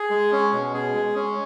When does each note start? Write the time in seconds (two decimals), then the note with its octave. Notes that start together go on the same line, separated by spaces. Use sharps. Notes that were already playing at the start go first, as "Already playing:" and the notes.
Already playing: G#4
0.10 G#3
0.32 C#4
0.52 B2
0.74 G#4
0.95 G#3
1.16 C#4